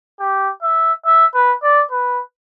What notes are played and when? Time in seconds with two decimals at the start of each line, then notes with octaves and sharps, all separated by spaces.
0.20 G4
0.62 E5
1.06 E5
1.34 B4
1.63 D5
1.91 B4